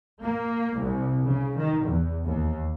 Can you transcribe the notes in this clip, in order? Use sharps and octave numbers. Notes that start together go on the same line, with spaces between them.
A#3
C2
C#3
D#3
E2
D#2